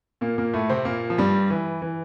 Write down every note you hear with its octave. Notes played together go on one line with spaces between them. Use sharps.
A#2 A#3
A#2 A#3
A2 A3
C3 C4
A#2 A#3
F3
G2 G3
E3
E3